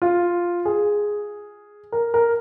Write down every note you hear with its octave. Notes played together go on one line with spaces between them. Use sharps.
F4
G#4
A#4
A#4